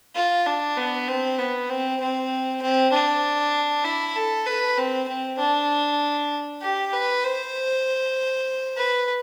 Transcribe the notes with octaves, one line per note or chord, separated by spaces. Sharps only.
F4
D4
B3
C4
B3
C4
C4
C4
D4
E4
A4
B4
C4
C4
D4
G4
B4
C5
B4